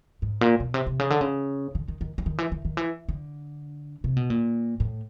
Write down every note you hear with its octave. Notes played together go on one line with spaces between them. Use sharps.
G#2
A#2
B2
C3
C3
C#3
D3
C#3
D3
D#3
D#3
E3
D#3
E3
D#3
D#3
E3
D3
C3
B2
A#2
A2